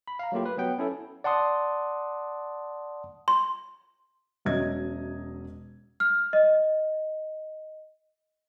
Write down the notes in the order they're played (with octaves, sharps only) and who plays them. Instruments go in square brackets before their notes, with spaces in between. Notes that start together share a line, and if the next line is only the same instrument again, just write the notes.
[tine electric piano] B5
F5 A#5
F#3 A3 A#3 F4 G4
B4
F#3 B3 G5
C#4 E4 A4
D5 F#5 A5 C6 D#6
[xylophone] C6
[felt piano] E1 F#3 C#4 D#5 E5 G#6
[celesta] F6
D#5